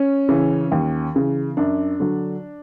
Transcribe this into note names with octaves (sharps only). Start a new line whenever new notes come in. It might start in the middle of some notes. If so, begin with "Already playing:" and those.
Already playing: C#4
C#3 E3
D#2
C#3 E3
F#2 D4
D3 F#3